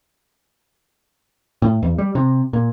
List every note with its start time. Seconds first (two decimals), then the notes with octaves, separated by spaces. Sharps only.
1.62 A2
1.83 E2
1.98 G3
2.15 C3
2.53 A#2